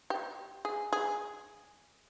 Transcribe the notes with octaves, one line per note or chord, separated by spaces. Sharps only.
G4
G#4
G#4